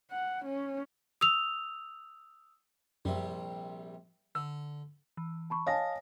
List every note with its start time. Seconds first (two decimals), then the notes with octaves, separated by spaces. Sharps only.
0.12 F#5
0.46 C#4
1.21 D#6 E6 F7
3.05 A#1 F#2 C3 G3
4.35 D3 E6
5.17 E3
5.50 A5 B5 C#6
5.67 C#5 D#5 F5 G#5 A5 D#6 A#6